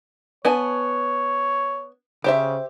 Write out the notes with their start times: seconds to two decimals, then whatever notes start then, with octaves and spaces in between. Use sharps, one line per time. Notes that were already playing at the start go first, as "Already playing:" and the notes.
0.45 B3 C#5 G#5 A5
2.24 C#3 G4 C5 E5